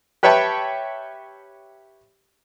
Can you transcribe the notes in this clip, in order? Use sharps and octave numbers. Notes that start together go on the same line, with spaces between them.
G4 B4 C#5 E5 G5 A5